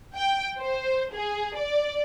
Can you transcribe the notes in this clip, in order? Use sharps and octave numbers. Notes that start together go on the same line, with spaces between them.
G5
C5
G#4
D5